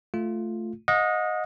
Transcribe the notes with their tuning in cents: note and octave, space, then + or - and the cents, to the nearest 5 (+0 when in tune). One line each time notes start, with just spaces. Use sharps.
A3 +0 F4 +0
D#5 +0 F#5 -40